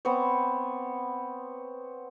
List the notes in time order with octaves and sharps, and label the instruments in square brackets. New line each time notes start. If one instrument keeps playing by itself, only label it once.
[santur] B3 C4 C5 C#5